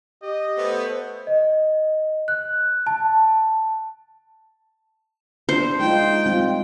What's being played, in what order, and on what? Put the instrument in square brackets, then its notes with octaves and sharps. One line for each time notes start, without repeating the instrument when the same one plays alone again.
[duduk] G4 [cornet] D#5
[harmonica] A3 B3 [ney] C5
[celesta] D#5
F#6
A5
[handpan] D4 [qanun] C5
[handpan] G#3 D#4 F4 [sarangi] G5
[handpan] G3 C4 F4